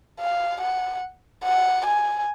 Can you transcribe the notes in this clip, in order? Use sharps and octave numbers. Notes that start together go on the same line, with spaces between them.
F5
F#5
F#5
G#5